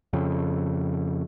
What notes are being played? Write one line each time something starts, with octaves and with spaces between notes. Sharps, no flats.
F2 C#3